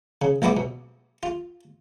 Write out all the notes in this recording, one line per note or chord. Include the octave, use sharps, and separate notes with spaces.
C#3
A#1 G#3 B3 E4 D6
B2
F4